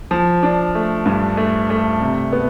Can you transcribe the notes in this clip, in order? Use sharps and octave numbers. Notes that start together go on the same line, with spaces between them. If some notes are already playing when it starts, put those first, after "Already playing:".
F3
D4
A3
G2
A3
A3
C3
B3